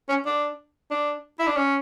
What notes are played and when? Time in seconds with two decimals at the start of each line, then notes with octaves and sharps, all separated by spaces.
0.09 C#4
0.26 D4
0.91 D4
1.39 E4
1.47 D4
1.56 C#4